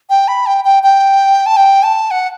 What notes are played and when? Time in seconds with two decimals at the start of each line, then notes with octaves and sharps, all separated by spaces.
0.10 G5
0.28 B5
0.46 G5
0.65 G5
0.83 G5
1.46 A5
1.57 G5
1.83 A5
2.11 F#5